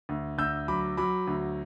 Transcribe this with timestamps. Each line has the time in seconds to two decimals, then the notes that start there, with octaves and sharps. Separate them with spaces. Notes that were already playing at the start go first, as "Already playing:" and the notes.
0.09 D2
0.38 D2 E6 G6
0.68 F#3 B5 D6
0.97 F#3 B5 D6
1.27 D2